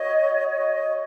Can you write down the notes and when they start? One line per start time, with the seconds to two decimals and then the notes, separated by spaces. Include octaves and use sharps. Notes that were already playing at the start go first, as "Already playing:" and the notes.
Already playing: F#4 C#5 D#5
0.52 D#5